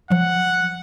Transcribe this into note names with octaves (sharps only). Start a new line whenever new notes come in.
F3 F#3 F#5